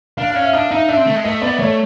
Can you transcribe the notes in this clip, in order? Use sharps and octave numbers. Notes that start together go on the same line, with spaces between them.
D4 F5
F5
C#4
E5
D4 D#5
D#4 E5
D4 E5
C4
A3
G#3
A3 D#5
B3 D5
A3 C#5